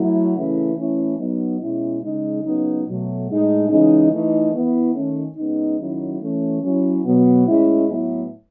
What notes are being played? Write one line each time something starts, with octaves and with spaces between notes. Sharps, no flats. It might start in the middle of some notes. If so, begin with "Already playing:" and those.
Already playing: F#3 A3 E4
C#3 E3 A3 E4
E3 A3 C#4 E4
F#3 B3 D#4
B2 G#3 C#4 E4
C#3 G#3 D#4
C#3 F#3 B3 D#4
B2 F#3 A3
A2 G#3 D#4
C#3 E3 G#3 D#4
E3 A3 D#4
E3 B3 E4
D#3 A3 C#4
C#3 G#3 B3 D#4
D#3 F#3 C#4 E4
E3 A3 C#4
F#3 C#4 E4
B2 F#3 B3
A2 G#3 C#4 E4
A2 F#3 B3 E4